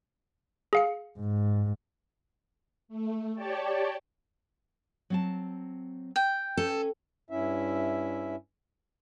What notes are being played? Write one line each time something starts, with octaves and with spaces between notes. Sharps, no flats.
G#4 F5 C#7
G#2
A3
G4 C#5 D5 G5 A5
F#3 C4 A5
G5
C#4 A4
G2 C#4 E4 E5